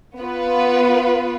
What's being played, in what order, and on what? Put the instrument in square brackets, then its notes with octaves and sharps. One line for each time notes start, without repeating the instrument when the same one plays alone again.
[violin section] B3 F4 B4